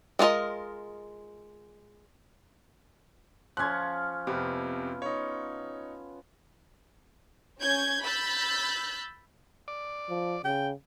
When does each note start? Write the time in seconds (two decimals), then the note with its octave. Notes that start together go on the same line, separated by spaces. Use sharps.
0.19 G#3 D4 F4 A#4 D#5
3.57 F3 C#4 F4 F#6 G#6
4.27 F2 C3 B3
5.02 D#4 C#5
7.60 C#4 G6 G#6
8.03 B5 E6 F#6 G6 A6
9.68 D5
10.09 F3
10.45 C#3 G5